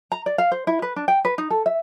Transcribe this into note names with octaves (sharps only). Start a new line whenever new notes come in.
A#5
D5
F5
C5
E4
B4
D4
G5
B4
D#4
A4
E5